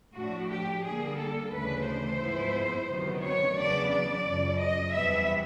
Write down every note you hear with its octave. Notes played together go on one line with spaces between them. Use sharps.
A2 F3 A3 D4 F#4
G4
D3 G3 A#3 G#4
A4
D2 C#3 E3 A3 D4 B4
C5
G#2 F3 G#3 B3 E4
D2 C3 D#3 F#3 B3
C#5
E2 C#3 F#3 B3 D4 D5
D5
F#2 C#3 F3
D#5
E2 C3 E3 G3 B3 E5